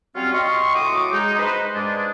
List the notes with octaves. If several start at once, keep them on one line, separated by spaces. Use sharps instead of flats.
F#3 G3 C4 C#4 F4
D#5 G5 C6 C#6
A2 F#3 F#4 D6 D#6
G#3 D#4
D#4 B4 C5
G#2 G#3 D4